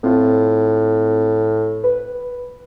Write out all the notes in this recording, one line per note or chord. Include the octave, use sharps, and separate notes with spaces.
A2 C4 F4
B4